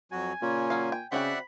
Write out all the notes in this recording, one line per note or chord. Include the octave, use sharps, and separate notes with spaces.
F2 F#3 F#4 G#5
A#2 C#3 C#4
F#3 F5
G5
C#3 C4 F#4 D5 E5 F#5 G5 B5